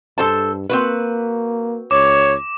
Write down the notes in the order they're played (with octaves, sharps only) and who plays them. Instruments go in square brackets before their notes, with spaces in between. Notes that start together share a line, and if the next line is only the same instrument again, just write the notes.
[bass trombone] G2 [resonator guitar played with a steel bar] A4 C5 A5
[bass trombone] A#3 [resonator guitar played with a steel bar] C4 F#4 B4
[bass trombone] C#2 [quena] C#5 [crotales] D6